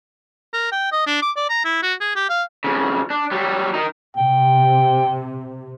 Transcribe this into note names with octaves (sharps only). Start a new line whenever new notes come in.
A#4
G5
D#5
D4
D6
D5
A#5
E4
F#4
G#4
G4
F5
F2 C#3
D4
F#3 G3
D#3 D#4
C3 G5